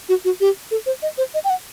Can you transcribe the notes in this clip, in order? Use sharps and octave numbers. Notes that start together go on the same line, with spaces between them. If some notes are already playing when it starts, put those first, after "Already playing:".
F#4
F#4
G4
A4
C5
D#5
C5
D#5
G5
F#5